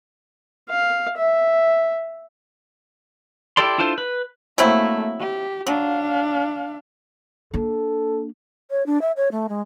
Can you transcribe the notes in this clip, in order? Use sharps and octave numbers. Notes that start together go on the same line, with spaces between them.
F5
E5
E4 G4 A4 D5 C6
D4 E4 F4 A4 C5
B4
F#3 A3 A#3 C4 E4
G4
F#3 D4 F5
A#3 D4 A4
C#5
D4
E5
C#5
A3
G#3